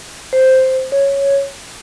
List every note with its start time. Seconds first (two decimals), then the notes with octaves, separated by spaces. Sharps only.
0.33 C5
0.92 C#5